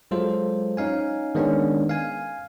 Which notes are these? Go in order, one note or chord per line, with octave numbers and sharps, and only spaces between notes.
F#3 G#3 F4 A4 C5
C#4 D#4 F5 G#5
D#3 G#3 B3 C#4 D4
F5 G#5